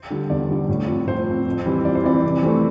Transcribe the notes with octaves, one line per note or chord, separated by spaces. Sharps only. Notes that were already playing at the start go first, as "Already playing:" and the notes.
Already playing: C5
D3 G3
E2 D5
D3 G3
A2
F3 C4
A2 C5
F3 C4
F2
E3 G3 C4
F2 D5
C5
E3 G3 C4 D5
C3
E3 A3 C4